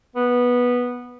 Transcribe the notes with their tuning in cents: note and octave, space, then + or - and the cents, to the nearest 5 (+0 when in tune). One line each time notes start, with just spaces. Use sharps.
B3 -10